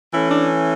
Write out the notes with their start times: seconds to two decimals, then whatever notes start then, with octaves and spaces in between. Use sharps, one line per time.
0.12 E3 A3 C#4 E4
0.31 D4